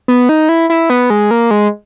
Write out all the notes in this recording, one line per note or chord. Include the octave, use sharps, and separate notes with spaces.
B3
D#4
E4
E4
B3
G#3
A#3
G#3